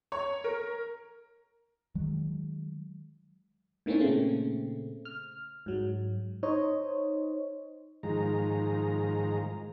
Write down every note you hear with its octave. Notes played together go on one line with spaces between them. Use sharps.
C#5
A#4
D#3 F#3 G#3
A2 D#3 A#3 C4 C#4
A#2 C#3 A3 C4
F6
G#2 F#3
D#4 C5 C#5 D#5
G#2 D#3 F3 G#3 A#5